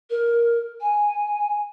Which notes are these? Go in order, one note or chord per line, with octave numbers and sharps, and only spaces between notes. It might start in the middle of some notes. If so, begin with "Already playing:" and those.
A#4
G#5